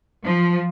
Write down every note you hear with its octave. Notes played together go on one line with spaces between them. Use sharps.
F3